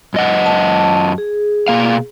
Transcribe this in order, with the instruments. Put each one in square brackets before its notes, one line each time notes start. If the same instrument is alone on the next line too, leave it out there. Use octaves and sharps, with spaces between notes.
[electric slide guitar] F#2 D#5 F#5
[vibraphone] A5
G#4
[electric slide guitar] B2 A#3 F5